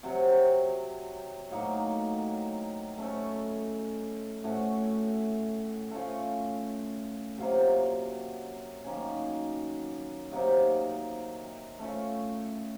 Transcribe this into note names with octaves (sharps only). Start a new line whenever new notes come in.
C3 F#3 C4 F#4
A2 F#3 A#3 D#4
A3 C#4 A4
A2 A3 C#4 F#4
A3 C#4 F4
C3 F#3 A#3 F4
F#2 D#3 A#3 C#4
C3 F#3 A#3 D#4
A3 C#4 F4